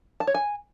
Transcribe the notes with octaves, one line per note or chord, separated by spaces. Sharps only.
A5
C#5
G#5